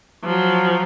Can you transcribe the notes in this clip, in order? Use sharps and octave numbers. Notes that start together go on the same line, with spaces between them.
F3 F#3